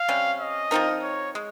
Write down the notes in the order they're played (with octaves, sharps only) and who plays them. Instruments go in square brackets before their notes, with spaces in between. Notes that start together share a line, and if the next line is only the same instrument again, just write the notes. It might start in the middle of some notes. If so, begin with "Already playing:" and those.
Already playing: [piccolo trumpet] F5
[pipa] C3 G3 C#4
[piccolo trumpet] D#5
[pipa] F3 C4 D#4 A#4
[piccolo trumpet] C#5
[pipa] G#3